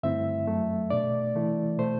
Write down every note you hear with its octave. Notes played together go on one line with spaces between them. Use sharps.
G2 D3 A3 C4 E4 E5
F#2 F#3 A3
B2 A3 D4 D5
C3 E3 A3 E4
B2 A3 C5